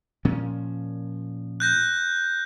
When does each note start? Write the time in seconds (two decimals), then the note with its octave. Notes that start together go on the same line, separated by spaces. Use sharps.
0.25 A#2 F3 C#4
1.60 F#6 G6 A#6